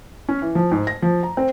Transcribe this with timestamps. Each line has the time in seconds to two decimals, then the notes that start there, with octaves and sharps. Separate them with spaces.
0.29 C#4
0.42 E3
0.55 F3
0.72 G#2
0.87 A#6
1.02 F3
1.23 A#5
1.37 C4